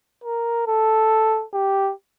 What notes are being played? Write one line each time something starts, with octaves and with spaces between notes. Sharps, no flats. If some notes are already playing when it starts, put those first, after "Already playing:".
A#4
A4
G4